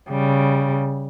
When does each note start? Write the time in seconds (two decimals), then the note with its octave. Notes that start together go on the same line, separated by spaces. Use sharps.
0.10 C#3 G3